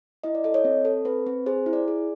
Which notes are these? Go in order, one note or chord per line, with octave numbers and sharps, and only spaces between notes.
E4 D#5
D5
A4 D#5
C#5
C4
A4
C4 B4
C4
G#4 C5
E4
D5
G#4